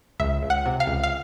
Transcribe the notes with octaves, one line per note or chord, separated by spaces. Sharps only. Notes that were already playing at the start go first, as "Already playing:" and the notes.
C#2 E5
C#2
F#5
C3
F5
C#2
F5